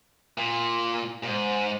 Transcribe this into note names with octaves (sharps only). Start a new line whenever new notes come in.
A#2
A#2
G#2